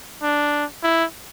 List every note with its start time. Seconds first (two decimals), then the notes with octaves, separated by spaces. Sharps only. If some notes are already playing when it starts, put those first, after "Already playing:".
0.23 D4
0.83 E4